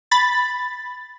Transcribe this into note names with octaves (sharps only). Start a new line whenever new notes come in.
B5 A6